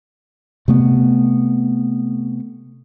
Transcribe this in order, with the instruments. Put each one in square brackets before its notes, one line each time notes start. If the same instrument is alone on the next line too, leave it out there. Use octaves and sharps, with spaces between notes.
[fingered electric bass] C3 A3 B3